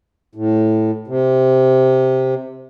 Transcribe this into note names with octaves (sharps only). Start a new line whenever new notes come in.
A2
C3